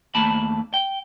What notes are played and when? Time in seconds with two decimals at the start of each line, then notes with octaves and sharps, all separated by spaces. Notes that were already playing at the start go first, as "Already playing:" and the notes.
0.15 D#2 A3 A#3 A5 B5
0.74 G5